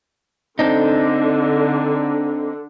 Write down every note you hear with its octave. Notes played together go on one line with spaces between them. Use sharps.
D3 C4 D4 D#4